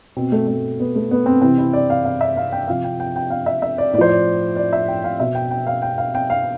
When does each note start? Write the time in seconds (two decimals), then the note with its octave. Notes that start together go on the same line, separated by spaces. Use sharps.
0.16 B2 C4
0.32 A3
0.47 A3
0.80 B3
0.95 A3
1.11 B3
1.26 C4
1.42 C3 E3 C4
1.58 E4
1.73 D5
1.90 F5
2.05 F5
2.21 E5
2.37 F5
2.52 G5
2.68 C3 F3 F5
2.84 G5
3.00 G5
3.16 G5
3.30 F5
3.46 E5
3.62 E5
3.78 D5
3.93 A2 D5
3.98 F3 C5
4.09 D5
4.56 D5
4.73 E5
4.88 G5
5.04 F5
5.20 B2 E5
5.35 G5
5.51 G5
5.67 F5
5.82 G5
5.98 F5
6.15 G5
6.30 F5